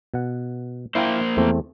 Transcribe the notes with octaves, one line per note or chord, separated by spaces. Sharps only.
B2 F#5
A#3 E4 C5 F5 G5
E2 A3 C4